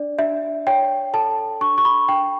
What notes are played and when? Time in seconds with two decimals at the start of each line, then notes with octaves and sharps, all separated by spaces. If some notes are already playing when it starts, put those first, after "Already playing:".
Already playing: D4 D5
0.19 D4 E5
0.67 C#5 G5
1.14 A4 A5
1.61 D4 C#6
1.78 C#6
1.85 B5
2.08 D4 G5